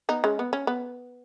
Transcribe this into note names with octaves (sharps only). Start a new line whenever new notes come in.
B3 D#4
G#3 C#4
B3
C#4
B3